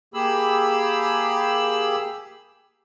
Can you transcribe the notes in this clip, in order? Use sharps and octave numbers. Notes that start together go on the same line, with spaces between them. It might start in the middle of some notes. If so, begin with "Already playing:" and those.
A#3 G4 G#4 B5 E6